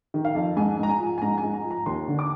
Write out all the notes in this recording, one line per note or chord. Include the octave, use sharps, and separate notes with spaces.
D#3
F5
F2
G#2 G#5
G#2 A#5
G#5
F3
G#5
G#2 A#5
G#5
G#2
A#5
F3
A#5
D#2 C6
D3
D6